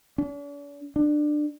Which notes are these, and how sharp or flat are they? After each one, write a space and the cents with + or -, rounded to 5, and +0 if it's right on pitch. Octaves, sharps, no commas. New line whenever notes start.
D4 -45
D4 +20